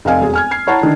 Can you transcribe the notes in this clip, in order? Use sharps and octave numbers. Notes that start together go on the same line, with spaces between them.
F1 C4 D#5 F5 G#5
E1 G#4
G#5 F6 G#6
G#6 C7
E4 C#5 F#5 A5 A#5
D3 D#3 D4